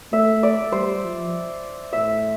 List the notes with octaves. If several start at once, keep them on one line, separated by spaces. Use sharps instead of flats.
A3 E5
D5
G3 C5
F3
A2 E5